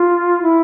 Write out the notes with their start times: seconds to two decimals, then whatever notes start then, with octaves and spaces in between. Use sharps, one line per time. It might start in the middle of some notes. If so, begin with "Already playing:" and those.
Already playing: F4
0.42 E4